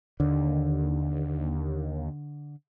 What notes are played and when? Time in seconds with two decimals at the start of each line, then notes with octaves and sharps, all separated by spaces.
0.20 D#2 D3